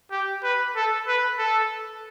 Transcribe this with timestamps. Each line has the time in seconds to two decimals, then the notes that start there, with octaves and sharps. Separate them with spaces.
0.11 G4
0.44 B4
0.76 A4
1.07 B4
1.39 A4